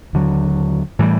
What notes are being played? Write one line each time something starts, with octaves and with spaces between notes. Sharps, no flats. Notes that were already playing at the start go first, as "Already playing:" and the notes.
D#2 D3 F#3
A2 E3 G3